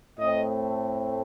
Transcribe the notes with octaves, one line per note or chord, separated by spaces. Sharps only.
A2 A3 C4 D#5